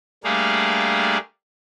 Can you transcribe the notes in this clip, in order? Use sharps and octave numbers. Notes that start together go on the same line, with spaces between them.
G3 A3 A#3 D4 G#4 F5